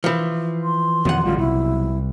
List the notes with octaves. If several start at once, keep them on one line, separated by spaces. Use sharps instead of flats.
E3 F3
C6
B1 F2 D#3 E3 F#5
A1 D3 G3 F4
C2 E4